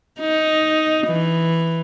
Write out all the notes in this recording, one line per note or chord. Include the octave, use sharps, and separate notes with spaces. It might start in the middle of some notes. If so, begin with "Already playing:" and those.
D#4
E3